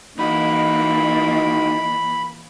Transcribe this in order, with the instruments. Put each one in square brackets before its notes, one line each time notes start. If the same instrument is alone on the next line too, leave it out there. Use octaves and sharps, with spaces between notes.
[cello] E3 A#3 [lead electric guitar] D#4 F#4 [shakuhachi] D#5 [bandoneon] B5